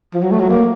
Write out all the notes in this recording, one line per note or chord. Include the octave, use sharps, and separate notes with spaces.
F3
F#3
A3
F#3
A#3